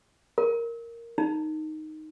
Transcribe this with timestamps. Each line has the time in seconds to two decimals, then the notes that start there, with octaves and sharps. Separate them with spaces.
0.38 A#4
1.18 D#4